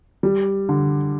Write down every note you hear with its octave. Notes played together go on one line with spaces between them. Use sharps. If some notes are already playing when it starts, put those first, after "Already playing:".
G3
D3